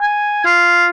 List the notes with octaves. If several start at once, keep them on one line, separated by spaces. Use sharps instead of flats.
G#5
F4